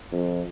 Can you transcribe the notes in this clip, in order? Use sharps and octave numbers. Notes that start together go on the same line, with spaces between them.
F2